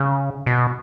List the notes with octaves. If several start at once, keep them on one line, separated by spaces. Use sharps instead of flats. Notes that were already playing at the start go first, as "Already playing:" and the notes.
Already playing: C#3
B2